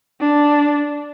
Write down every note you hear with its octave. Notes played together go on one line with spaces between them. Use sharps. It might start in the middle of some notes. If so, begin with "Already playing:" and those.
D4